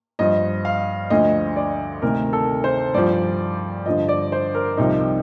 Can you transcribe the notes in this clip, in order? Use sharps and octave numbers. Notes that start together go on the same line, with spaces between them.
G2 F3 D#5
F5
D2 D3 F3 D#5
D5
D2 C3 D#3 A#4
A4
C5
G2 F3 D5
G2 D3 F3 D#5
D5
C5
A#4
C2 C3 F3 D#4